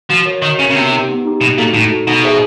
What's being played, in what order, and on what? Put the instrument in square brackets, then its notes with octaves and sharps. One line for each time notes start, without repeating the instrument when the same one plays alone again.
[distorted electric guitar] F3 [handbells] F#4
[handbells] A#4 C#5
[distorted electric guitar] D#3 [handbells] F#4
[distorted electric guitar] C#3 [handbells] A#4
[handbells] C#5
[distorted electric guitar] C#3
[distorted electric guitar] C3 [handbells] B3
[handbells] D#4 G4
B3
D#4 G4
[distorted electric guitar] B2 [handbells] D#4
[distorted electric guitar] A#2 [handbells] F#4 A4
[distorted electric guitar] A2 [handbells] D#4
[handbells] F#4 A4
[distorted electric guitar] B2 [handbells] D#4
[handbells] G#4 C5 E5